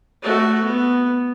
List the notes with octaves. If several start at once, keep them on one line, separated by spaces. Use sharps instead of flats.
A3 F#4
B3